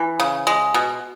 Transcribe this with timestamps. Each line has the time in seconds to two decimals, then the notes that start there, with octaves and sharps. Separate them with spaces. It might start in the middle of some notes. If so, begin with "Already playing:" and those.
Already playing: E3
0.20 C#3
0.47 G#3
0.74 B2